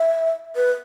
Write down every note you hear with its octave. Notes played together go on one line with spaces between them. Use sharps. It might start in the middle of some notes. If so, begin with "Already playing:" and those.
Already playing: E5
B4